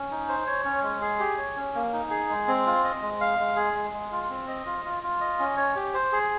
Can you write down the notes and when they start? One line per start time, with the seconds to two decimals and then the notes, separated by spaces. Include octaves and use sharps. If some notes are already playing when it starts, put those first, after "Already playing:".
Already playing: C#4
0.11 D#4
0.29 C5
0.46 C#5
0.65 C#4
0.83 G#3
1.01 G#4
1.20 G4
1.37 C#5
1.56 C#4
1.75 A#3
1.93 D#4
2.10 G#4
2.29 G#3
2.48 C4
2.66 F4
2.84 D#5
3.02 G#3
3.21 F5
3.39 G#3
3.56 G#4
3.75 G#3
3.93 G#3
4.12 F4
4.30 C4
4.48 D#5
4.66 F4
4.85 F4
5.03 F4
5.21 D#5
5.39 C#4
5.57 C#5
5.76 G4
5.94 C5
6.12 G#4